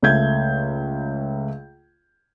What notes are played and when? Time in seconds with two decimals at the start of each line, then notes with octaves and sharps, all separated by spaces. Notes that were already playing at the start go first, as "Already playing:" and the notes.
0.02 C#2 A3 G6 G#6